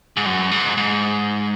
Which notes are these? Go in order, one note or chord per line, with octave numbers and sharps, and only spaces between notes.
G#2
F#2
G#2
G#2